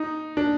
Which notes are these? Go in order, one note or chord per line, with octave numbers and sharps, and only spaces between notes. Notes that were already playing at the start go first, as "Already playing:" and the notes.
Already playing: D#4
D4